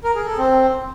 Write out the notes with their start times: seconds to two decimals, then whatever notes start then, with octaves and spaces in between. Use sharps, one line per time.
0.04 A#4
0.15 G#4
0.26 A4
0.38 C4